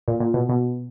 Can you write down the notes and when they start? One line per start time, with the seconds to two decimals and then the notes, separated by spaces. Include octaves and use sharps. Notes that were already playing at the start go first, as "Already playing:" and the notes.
0.08 A#2
0.20 A#2
0.34 B2
0.49 B2